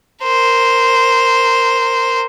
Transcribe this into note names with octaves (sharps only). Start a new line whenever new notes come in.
A#4 C5